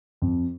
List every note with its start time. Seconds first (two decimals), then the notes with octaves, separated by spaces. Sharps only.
0.22 F2